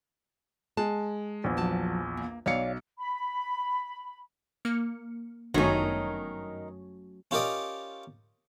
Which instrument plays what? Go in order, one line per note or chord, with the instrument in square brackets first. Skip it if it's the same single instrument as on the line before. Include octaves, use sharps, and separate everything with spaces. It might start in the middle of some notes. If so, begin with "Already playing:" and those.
[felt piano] G#3 [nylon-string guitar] A5
[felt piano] A#1 E2
[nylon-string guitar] F3 F#3 A5
A#3
[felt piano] B1 C#7 [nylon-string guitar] C#5 D5 F5
[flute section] B5
[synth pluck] A#3 F6 C#7
[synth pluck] G1 F#2 [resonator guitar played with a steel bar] D#3 D#4 [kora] F#3 A3 C#4
[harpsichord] C#4 F4 G4 A#4 D5 D#5